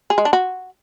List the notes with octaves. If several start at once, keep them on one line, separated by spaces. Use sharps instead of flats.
G#4
G#3
D4
F#4